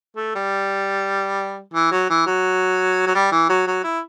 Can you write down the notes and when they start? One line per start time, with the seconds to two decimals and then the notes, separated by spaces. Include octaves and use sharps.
0.16 A3
0.35 G3
1.74 E3
1.92 F#3
2.10 E3
2.26 F#3
3.07 F#3
3.15 G3
3.32 E3
3.49 F#3
3.67 F#3
3.84 E4